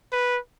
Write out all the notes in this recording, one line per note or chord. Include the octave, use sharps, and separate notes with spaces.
B4